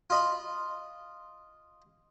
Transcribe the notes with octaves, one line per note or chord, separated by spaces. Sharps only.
F4 D#5 B5